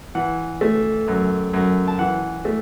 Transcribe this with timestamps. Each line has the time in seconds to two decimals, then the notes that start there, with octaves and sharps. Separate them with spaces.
0.15 E3 F#5
0.61 A3
1.07 F#2
1.53 F#2
1.88 A5
1.99 E3 F#5
2.45 A3